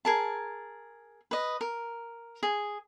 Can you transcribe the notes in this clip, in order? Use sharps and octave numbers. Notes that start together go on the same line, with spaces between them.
G#4 A#4 A5
B4 D#5
A#4
G#4